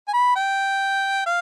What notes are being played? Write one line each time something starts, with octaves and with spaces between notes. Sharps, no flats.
G#5
B5
G5
F5